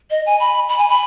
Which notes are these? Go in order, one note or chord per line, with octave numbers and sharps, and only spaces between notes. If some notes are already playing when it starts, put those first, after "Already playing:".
D#5
G#5
B5
B5
G#5
B5